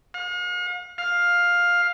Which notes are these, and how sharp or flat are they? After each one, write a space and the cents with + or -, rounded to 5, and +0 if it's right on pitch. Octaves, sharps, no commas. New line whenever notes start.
F5 +45
F5 +10